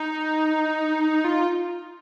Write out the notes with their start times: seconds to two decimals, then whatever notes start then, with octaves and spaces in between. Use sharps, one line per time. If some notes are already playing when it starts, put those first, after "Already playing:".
Already playing: D#4
1.24 F4